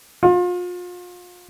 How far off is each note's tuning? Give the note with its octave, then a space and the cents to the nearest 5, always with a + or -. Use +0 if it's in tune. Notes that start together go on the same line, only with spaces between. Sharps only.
F4 +35